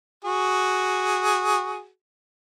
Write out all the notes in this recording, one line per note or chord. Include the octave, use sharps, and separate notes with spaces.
F#4 G#4